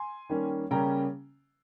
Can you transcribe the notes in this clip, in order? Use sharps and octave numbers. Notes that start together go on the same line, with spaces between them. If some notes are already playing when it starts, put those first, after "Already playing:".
Already playing: G#5 C6
D#3 G3 A#3 C#4
C#3 G3 A#3 C#4 G5 A#5